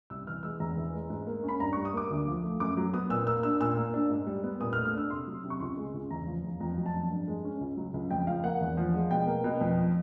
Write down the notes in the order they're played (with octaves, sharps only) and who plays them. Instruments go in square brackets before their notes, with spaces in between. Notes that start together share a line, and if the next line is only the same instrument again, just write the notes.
[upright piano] C2 E6
E3 F6
G#3 E6
E2 A#5
E3
G#3
G#2
A#3
C#4
B5
G2 A#5
C#6
G3
D#6
A#3 D6
D2
F3
A3
F#2 D6
F#3
B3 D#6
A#2 E6
A#3 E6
D4 E6
A#2 E6
A#3
D4
G#2
G3
B3
A#2 D#6
F6
A3
F6
D4 E6
C3 C6
F#3
C3
C#6
C#2 C6
G#3
C#2
E2 A#5
F3
E2
F2 A#5
F#3
A5
F2
G2
G#3
C#4
C#2
F#3
C#2
F2 G5
F3 F5
A#3 F#5
E2
F3
G#3
B2 G5
A#3
B2
F2
F3